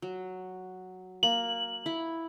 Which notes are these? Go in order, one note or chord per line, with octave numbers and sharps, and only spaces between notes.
F#3
A#3 F#7
E4 B5